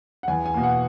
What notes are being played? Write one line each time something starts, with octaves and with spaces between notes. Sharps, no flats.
F#5
E2 G#5
G#5
B2 A#3
F#5